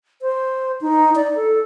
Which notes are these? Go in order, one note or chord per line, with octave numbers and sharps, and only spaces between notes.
C5
D#4
D5
A4